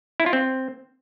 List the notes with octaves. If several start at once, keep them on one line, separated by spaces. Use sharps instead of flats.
E4
F4
C4